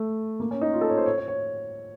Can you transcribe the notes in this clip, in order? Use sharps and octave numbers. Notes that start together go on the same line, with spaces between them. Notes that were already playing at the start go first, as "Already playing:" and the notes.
Already playing: A3
A#3
C#4
D#4
F4
A4
C#5
C5
C#5
C#5
C#5